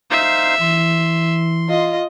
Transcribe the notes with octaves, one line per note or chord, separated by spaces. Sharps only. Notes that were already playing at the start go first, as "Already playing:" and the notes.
D#4 C5 E5 F5
E3 C6
F4 D#5